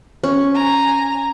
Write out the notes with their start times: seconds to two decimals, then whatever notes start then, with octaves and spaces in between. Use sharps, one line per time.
0.23 C#4
0.55 G#5 A#5